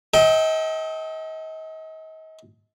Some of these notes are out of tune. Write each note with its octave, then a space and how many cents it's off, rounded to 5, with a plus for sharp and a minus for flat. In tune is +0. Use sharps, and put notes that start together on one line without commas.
A4 -20 D#5 +35 G5 +0